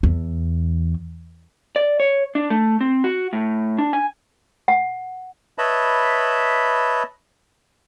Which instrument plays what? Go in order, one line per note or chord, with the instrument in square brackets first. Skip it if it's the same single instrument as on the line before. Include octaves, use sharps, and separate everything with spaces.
[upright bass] E2
[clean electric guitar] D5
C#5
D4
A3
C4
F#4
A2
D4
G#5
[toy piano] F#5
[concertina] B4 C#5 D#5 E5 A5 B5